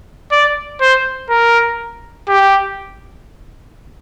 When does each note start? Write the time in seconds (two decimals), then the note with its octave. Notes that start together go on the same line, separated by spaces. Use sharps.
0.32 D5
0.81 C5
1.29 A#4
2.28 G4